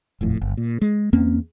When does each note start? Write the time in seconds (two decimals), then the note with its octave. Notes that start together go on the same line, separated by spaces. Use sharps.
0.21 D#1 F2 A2
0.41 G1
0.57 A#2
0.82 G#3
1.13 E2 A#3 C4 C#4